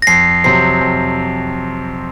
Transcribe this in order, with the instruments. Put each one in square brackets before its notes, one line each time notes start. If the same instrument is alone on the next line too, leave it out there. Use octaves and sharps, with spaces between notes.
[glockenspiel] A#6
[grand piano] F2 [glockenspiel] C7
[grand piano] C3 F#3 C4 [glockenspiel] C7
[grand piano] F2